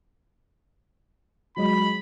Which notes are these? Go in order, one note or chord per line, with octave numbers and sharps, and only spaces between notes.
F#3 G#3 D#5 B5